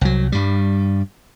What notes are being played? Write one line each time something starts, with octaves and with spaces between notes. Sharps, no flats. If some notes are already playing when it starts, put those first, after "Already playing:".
C2 F#3
G2 G3